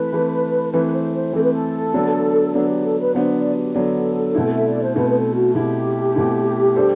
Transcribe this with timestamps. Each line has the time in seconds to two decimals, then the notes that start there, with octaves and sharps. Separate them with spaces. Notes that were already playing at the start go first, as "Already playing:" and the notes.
Already playing: E3 A3 C4 B4
0.13 E3 A3 C4
0.73 E3 A3 C4 B4
0.86 B4
0.94 C5
1.14 C5
1.33 E3 A3 C4 A4
1.43 B4
1.53 A4
1.94 D3 F#3 B3 D4
2.54 D3 F#3 B3 D4 A4
2.69 G4
2.85 A4
2.99 B4
3.14 D3 F#3 B3 D4 C5
3.35 D5
3.55 G4
3.74 D3 F#3 B3 D4 A4
4.35 B2 A3 C4 E4
4.55 E5
4.68 D5
4.82 C5
4.95 B2 A3 C4 E4 B4
5.09 B4
5.15 A4
5.35 F#4
5.55 B2 A3 C4 E4 G4
6.15 B2 A3 C4 E4
6.76 G3 D4 A4 C5